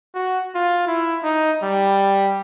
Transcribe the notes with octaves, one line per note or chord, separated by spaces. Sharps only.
F#4
F4
E4
D#4
G3